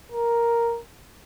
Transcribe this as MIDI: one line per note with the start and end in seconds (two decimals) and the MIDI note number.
0.12 0.80 70